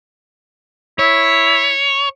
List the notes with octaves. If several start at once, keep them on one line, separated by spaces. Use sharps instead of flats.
E4 C#5